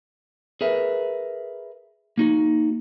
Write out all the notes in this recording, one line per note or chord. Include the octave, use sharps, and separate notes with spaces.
G#4 A#4 B4 E5
A#3 D#4 F#4